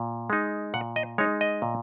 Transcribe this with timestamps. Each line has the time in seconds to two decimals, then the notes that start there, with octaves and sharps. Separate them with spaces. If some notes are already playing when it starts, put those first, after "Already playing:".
Already playing: A#2
0.30 G#3 D#4
0.74 A#2 F#5
0.96 D#5
1.18 G#3 D#4 C#5
1.41 D#5
1.62 A#2